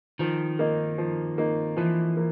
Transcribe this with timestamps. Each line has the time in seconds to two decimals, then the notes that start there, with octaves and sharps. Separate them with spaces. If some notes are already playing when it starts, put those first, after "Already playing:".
0.19 D#3 F3
0.59 A#3 D#4
0.98 F3
1.38 A#3 D#4
1.77 E3 F3
2.17 A#3